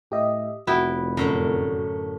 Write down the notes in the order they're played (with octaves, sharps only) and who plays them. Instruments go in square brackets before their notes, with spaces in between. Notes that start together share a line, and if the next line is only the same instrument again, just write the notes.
[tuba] A2 [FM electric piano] G4 D#5 E5
[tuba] F1 [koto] B3 E4 G5 [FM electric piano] F#4
[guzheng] F#2 A2 D3 [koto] A#4